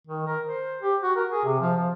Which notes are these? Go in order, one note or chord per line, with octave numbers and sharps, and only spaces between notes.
D#3
A#4
C5
G4
F#4
A#4
G#4
C3
F3
F3